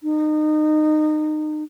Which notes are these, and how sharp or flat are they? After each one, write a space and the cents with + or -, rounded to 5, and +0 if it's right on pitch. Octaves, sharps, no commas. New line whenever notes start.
D#4 -25